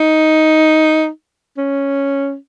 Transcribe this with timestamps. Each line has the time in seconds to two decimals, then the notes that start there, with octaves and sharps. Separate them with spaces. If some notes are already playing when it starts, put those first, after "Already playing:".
Already playing: D#4
1.57 C#4